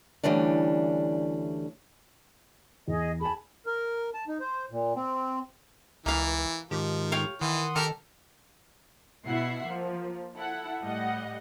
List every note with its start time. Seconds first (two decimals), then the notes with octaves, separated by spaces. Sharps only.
0.23 D2 E3 G3 C#4 D4
2.88 E2 G#4 D#5
3.21 G#4 G#5 A5 B5
3.66 A#4
4.14 A5
4.28 D#4
4.40 C5
4.71 A#2
4.96 C4
6.06 C#2 E3 A#3 F5
6.71 G#2 D#3 F3 G4
7.12 C#5 F5 G5
7.41 D#3 E3 F#5 C6 D#6
7.76 D#3 G4 A4 A#4 F6
9.27 B2 E4 E5 F#5 C7
9.66 F3 A#3
10.36 E4 A4 F#5
10.82 A2 G3 D#5 F#5